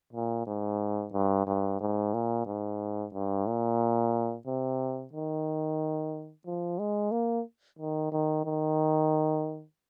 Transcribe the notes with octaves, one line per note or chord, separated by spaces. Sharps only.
A#2
G#2
G2
G2
G#2
A#2
G#2
G2
A#2
C3
D#3
F3
G#3
A#3
D#3
D#3
D#3